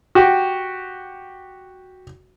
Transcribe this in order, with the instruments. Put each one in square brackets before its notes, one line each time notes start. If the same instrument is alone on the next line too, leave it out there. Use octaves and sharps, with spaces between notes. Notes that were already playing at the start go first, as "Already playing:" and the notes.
[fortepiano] F#4 G4